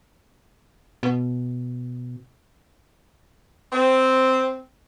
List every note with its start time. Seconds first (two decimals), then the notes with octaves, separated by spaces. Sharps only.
1.03 B2
3.73 C4